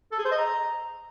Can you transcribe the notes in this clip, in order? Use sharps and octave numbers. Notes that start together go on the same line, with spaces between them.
A4
G#4
C5
D#5
A#5